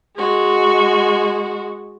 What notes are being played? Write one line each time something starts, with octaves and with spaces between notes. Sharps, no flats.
G#3 F#4